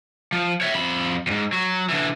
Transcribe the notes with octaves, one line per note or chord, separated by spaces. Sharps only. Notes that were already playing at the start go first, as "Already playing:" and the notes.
F3
C#5 E5
F2 B5
F2 G#2
F#3
D3 E3